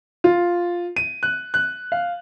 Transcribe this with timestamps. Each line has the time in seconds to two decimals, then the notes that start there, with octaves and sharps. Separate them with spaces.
0.24 F4
0.96 D#7
1.23 F#6
1.54 F#6
1.92 F5